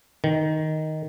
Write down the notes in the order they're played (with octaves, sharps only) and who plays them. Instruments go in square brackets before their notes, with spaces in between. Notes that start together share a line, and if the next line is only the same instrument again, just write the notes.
[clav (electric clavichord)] D#3